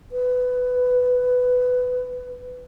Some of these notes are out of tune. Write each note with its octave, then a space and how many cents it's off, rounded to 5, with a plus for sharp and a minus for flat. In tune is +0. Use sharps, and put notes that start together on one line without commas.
B4 +15